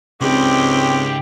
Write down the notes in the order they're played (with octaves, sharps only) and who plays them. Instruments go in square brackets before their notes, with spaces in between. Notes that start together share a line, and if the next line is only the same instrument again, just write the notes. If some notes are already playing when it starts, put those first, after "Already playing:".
[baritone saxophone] C#2 [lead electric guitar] C#3 D#4 [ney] C4 [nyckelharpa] G4 G5